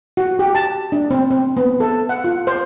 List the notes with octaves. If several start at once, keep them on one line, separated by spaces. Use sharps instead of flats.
F#4
G4
A5
D4
C4
C4
B3
A4
F#5
F4
C5